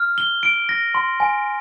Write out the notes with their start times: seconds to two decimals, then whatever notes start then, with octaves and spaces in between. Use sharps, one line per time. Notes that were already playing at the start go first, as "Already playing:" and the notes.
Already playing: F6
0.18 G7
0.43 D7
0.69 A#6
0.95 C6
1.20 G#5